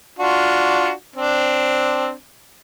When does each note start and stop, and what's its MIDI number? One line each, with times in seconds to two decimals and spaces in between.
0.19 0.91 62
0.19 0.91 65
0.19 0.91 66
1.16 2.13 60
1.16 2.13 62